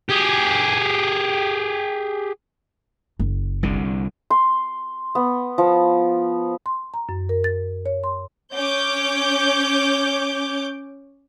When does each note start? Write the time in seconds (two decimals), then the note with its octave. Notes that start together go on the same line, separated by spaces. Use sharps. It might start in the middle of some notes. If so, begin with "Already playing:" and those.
0.09 G4 G#4
3.19 F#1
3.63 C2 D3
4.30 C6
5.15 B3
5.58 F3
6.66 C6
6.94 A#5
7.09 F#2
7.29 A#4
7.44 A6
7.86 C#5
8.04 C6
8.52 C#4 C#5 D6 G6